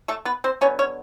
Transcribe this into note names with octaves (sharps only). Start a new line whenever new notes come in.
A3 A4
B3 B4
C4 C5
D3 F#3 B3 C#4 C#5
C#4 C#5